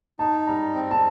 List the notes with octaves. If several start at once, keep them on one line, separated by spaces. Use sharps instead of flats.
D#4 A5
G3 A#5
C4
A5